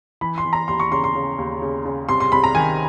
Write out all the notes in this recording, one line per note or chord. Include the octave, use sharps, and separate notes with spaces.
E3 B5
C6
E3
A#5
D#2 C6
C#6
C#3 C6
C6
C#3
D#2
C#3
C#3
C2 C6
C6
C2 B5
A#5
D#3 G#5